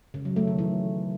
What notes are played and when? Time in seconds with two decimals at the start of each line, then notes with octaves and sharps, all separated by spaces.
0.14 C#3
0.25 F#3
0.36 A3
0.47 D#3
0.59 E3